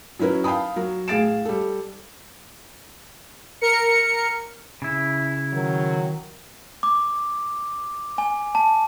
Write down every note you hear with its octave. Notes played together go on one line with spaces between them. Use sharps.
F#3 C#4 E4 A#4 B4
F5 G5 A5 B5 D#6
F#3 A#4
A2 G#4 F5 A6 D7 E7
G3 A4
A#4 C#7
C#3 E4
D#3 F#3
D6
G#5
A5